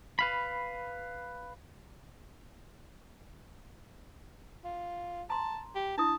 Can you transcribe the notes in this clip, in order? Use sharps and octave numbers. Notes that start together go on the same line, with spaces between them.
B4 F5 B5
F4
A5 A#5 C6
G4
D4 E4 A5 D#6